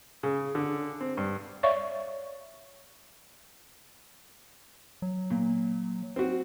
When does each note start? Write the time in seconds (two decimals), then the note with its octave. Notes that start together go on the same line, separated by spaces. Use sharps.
0.23 C#3
0.55 D3
1.01 C4
1.17 G2
1.63 C#5 D5 E5 F5 C#6
5.02 F#3
5.30 A#2
6.16 C4 F#4